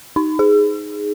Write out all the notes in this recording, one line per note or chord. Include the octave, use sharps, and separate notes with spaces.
D#4
G#4